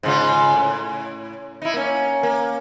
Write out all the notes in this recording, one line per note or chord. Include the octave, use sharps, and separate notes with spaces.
G#2 C#3 F4
A2
D#4 E4
A#3 C#4
A#3